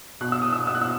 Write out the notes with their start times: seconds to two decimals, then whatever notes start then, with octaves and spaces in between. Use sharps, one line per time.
0.21 B2 F#6
0.32 E6
0.42 D#6
0.52 E6
0.67 E6
0.75 F#6
0.82 E6